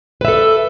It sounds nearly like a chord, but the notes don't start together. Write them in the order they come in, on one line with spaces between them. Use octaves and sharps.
B4 E5 A4